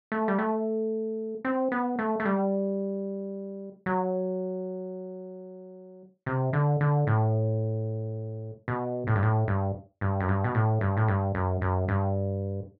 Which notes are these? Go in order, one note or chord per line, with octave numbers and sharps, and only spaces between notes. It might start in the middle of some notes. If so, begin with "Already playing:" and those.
A3
G3
A3
C4
B3
A3
A3
G3
F#3
C3
D3
D3
A2
B2
A2
G2
A2
G2
G2
F#2
G2
B2
A2
G2
A2
G2
F#2
F#2
G2